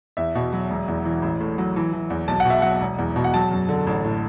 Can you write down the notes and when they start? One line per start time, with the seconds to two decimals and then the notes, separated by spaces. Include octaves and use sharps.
0.17 E2 E5
0.35 B2
0.53 F#3
0.71 E1
0.88 E2
1.05 E3
1.22 A1
1.40 A2
1.58 F#3
1.76 E3
1.93 E3
2.10 E2
2.28 B1 A5
2.40 F#5
2.45 B2
2.50 E5
2.62 F#3 F#5
2.81 E1
2.98 E2
3.16 B2
3.24 F#5
3.34 F#3 A5
3.51 F#2
3.69 D3
3.87 A1
4.04 A2